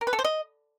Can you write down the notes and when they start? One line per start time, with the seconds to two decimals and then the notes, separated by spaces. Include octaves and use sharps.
0.01 A#4
0.07 B4
0.13 A4
0.19 C5
0.24 D#5